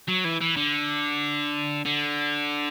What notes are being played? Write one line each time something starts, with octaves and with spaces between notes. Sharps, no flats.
F#3
E3
E3
D3
D3